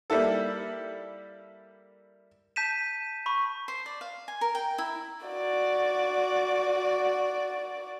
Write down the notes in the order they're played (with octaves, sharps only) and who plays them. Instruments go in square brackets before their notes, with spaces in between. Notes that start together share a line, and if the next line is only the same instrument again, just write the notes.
[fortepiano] G3 A#3 E4 A4
[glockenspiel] A5 G6 B6 D#7 E7
B5 C#6
[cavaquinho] C5
D5
F5
G#5
A#4
G5
E4
[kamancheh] F#4 D5